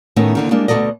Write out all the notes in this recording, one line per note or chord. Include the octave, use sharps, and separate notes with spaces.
A2 D#3 A3 B3 C#4 D#4
D#2 D3 D#3
G3 G#3 A#3 D4
D2 B2 F3 A4 D5 D#5